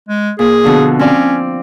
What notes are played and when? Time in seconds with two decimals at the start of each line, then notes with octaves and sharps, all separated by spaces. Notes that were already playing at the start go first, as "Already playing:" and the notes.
0.09 G#3
0.39 A#2 G#4
0.64 B2 D3 F3
0.99 C4 C#4 D5 F5